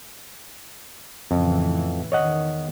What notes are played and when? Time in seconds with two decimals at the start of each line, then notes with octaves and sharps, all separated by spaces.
1.31 F2 A2 C#3 E3
2.12 E2 D#3 C#5 D#5 F#5